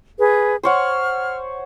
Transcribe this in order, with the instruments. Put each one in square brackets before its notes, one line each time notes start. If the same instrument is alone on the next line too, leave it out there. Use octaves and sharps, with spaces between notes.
[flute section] G#4 B4
[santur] C5 C#5 F#5 [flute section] F6